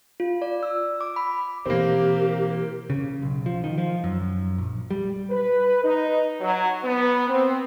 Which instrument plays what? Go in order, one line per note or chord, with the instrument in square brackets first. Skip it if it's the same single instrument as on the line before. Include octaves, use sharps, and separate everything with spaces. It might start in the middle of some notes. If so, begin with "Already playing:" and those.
[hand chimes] F4
D5
E6
D6
B5
[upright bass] B2 E3 [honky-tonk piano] A#3 C4 [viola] G4 [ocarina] A#4
[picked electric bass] C#3
B1
F3
D#3
F3
F#2
A#1
G3
[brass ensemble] B4
D#4
F#3
B3
C4